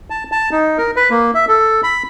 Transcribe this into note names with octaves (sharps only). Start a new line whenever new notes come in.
A5
A5
D#4
A#4
B4
A#3
E5
A4
B5